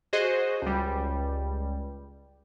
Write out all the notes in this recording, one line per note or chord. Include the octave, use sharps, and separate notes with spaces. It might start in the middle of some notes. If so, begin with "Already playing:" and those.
F#4 G#4 C5 D#5
C#2 G3